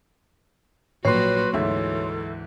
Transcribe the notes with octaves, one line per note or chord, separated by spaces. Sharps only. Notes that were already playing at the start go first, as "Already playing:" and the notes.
A#1 F#3 A#3 F#4 B4 C#5 C6 C7
D2 G#2 E3 A4 E5